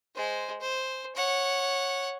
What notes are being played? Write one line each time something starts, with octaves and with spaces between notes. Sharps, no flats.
G#3 C5
C5
C#5 F#5